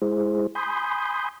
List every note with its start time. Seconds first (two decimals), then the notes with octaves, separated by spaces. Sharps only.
0.02 G#3 E4 G#4 C5
0.55 G#5 B5 C6 D#6 G6